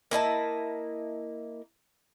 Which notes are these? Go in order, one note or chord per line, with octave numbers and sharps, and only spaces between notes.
A#3 E4 D#5 A5